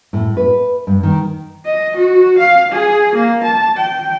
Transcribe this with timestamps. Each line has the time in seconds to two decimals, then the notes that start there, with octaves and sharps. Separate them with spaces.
0.13 A2
0.37 B4
0.87 G2
1.03 D#3
1.65 D#5
1.96 F#4
2.38 F5
2.72 G#4
3.15 A#3
3.44 A5
3.76 G5